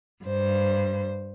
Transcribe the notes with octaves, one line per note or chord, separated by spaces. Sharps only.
G2 C5